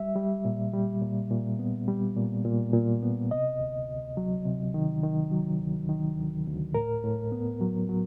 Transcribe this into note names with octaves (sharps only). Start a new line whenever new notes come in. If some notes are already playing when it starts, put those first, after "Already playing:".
Already playing: G3 E5
G3
A#2
G3
A#2
A#2
B3
G3
A#2
A#2
A#2
B3
C3 D#5
D2
D2
F#3
C3
D#3
D#3
F#3
D2
D#3
D2
D2
A2 A#4
A2
B3
F#3
F#3